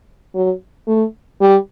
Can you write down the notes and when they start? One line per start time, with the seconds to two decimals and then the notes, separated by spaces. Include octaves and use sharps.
0.35 F#3
0.88 A3
1.40 G3